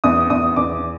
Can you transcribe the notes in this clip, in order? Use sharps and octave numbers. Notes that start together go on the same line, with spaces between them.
E2 D#6
E2 D#6
E2 D6